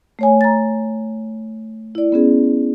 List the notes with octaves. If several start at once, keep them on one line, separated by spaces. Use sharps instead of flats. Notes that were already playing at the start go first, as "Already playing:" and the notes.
A3 C#5 G#5
A#5 A6
E4 D5
B3 C#4 G#4